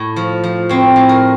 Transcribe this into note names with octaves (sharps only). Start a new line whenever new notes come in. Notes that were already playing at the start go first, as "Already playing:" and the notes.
Already playing: A2
F3
F3
A2 C4
A2
A#4